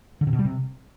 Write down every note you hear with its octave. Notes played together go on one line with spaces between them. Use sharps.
D3
C3
B2
G3
C3